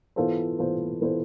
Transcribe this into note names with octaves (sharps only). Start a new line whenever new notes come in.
E3 B3 F4 A4 C5
E3 B3 F4 A4 C5
E3 B3 F4 A4 C5